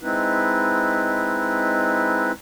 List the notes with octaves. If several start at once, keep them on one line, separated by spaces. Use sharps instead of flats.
G#3 C4 D#4 E4 B4